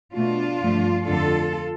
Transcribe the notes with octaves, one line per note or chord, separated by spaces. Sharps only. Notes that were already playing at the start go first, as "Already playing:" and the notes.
B2 A3 D4 F4
G2 F3 A3
F2 D3 A3 F4 A4